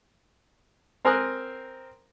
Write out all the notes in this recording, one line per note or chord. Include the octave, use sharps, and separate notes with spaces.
C4 A#4 C5 G#5 D#6 F#6